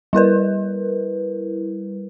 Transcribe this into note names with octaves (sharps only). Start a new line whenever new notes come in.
G3 E4 A#4 B4